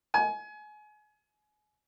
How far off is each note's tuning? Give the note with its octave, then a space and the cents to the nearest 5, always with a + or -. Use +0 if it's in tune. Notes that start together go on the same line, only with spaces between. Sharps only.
G#5 +30